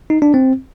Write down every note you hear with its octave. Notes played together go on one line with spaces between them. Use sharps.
D#4
D4
C4